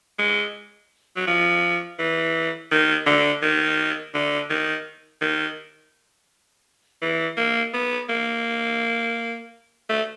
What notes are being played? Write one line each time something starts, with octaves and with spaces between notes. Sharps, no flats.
G#3
F#3
F3
E3
D#3
D3
D#3
D3
D#3
D#3
E3
A#3
B3
A#3
A3